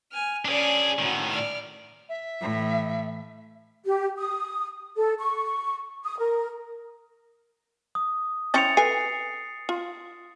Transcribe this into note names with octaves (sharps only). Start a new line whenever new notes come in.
G#5 F6
C#4 D4 G#4 D5
A2 D#3 C#4 F#4
D5 F6
E5
A2 E3
G4
D#6
A4
C#6
D#6
A#4
D#6
C4 C#4 E4 A6 C#7 F7
A4 B4 G#5 C7
F4